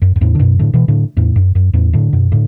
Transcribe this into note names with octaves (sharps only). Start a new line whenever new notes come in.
F#2
F#2
E2 A2
D3
F#2 B2
A2 D3
B2 E3
A2 D3
E2 A2
F#2
F#2
E2 A2
A2 D3
F#2 B2
A2 D3